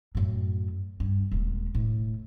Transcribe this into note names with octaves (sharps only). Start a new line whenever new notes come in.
F#2 A2
G2
D#1 G#3
A2